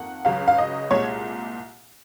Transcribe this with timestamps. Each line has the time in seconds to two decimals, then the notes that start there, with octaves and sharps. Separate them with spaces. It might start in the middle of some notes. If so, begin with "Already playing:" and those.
Already playing: F2 D#3 A#3 F#5
0.25 C#2 C#3 F#3 F5
0.48 F5
0.58 D#5
0.91 C2 A#2 G#3 C#5